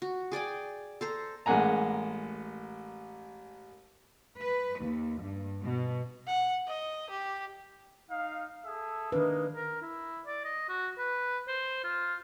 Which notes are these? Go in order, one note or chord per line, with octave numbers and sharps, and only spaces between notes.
F#4
G#4 D5 G5 G#5
A4 C5 A#5
A1 G#3 A#3 F#5 G#5 A#5
B4
D#2
G2
B2
F#5
D#5
G4
D#4 F5
G#4 A4 E5
D#3 G#3 A#3 D4 D#4 B4
A#4
E4
D5
D#5
F#4
B4
C5
F4